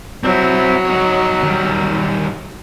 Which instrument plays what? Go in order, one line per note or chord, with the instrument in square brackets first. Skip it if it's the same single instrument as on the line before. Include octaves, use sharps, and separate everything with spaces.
[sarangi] F#3 [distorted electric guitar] C4 E4
[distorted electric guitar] D#4 C#5
D#3 G3